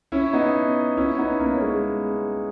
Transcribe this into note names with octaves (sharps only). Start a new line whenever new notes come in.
C#4 E4
B3 D#4
C#4 E4
B3 D#4
A#3 C#4
C#4
G#3 B3